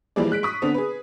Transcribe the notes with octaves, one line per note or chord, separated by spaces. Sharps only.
E3 F3 G3 A#3 G#4 D5
G#3 F#6 B6 D7
C#6 D#6 B6
D3 B3 C4 D4
G#4 B4